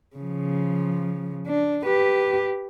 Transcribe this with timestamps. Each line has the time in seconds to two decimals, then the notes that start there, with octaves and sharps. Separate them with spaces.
0.16 C#3 F3
1.47 D4
1.85 G4 B4